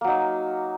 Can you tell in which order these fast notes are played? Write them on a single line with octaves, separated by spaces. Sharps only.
A#3 F#3 D#4